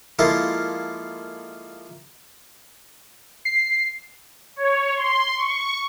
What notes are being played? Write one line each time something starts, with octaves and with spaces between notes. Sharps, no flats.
F3 G#3 A#3 E4 F4 A4
C7
C#5
C6
C#6